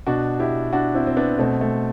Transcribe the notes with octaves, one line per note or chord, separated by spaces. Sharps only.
B2 D4 F#4
E4 G4
D4 F#4
C4 E4
C4
B3 D4
B2 A3 C4
A3